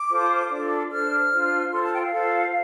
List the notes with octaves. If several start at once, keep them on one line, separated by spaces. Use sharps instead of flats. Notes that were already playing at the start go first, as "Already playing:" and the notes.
Already playing: D6
F4 A4 C5
D4 F4 A4
D4 A4 C5 F6
D4 F4 C5
F4 A4 C5 C6
A5
G5
F5
F4 A4 C5